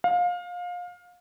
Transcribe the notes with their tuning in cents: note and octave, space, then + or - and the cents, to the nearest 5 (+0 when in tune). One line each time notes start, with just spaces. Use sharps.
F5 +25